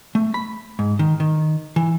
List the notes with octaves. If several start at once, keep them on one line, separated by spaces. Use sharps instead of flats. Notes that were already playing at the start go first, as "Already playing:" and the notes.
A3
B5
G#2
D#3
D#3
E3